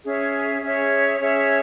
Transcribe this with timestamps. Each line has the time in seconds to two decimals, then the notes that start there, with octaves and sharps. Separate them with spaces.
0.04 C#4 G#4 C#5 E5
0.62 C#4 G#4 C#5 E5
1.19 C#4 G#4 C#5 E5